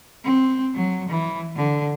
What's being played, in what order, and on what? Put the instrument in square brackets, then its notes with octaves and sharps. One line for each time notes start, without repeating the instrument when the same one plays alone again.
[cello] C4
F#3
E3
D3